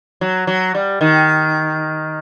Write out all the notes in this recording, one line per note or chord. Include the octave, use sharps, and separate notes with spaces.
F#3
F#3
G3
D#3